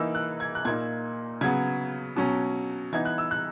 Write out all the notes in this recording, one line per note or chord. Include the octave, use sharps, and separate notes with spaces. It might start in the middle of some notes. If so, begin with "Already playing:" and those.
Already playing: E3 A#3 D#4 E6
F#6
G#6
F#6
A#2 A#3 D#4 G#6
C#3 F#3 B3 G#6
B2 F#3 C#4
E3 B3 D#4 G#6
F#6
E6
F#6